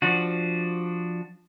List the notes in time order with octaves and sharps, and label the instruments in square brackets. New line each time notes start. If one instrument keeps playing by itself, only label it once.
[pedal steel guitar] F3 D4 F#4